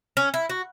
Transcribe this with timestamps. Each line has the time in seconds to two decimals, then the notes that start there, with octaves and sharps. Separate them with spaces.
0.17 C#4
0.34 E4
0.49 F#4